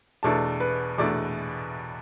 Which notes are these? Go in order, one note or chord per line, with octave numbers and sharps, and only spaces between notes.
E2 B2 A3 D4 A5
B4
E2 B2 A3 D4 D5